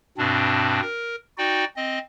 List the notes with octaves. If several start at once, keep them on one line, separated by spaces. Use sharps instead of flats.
G2 B2 C4 D4
A#4
D#4 F#4 D5 G5
C4 D#5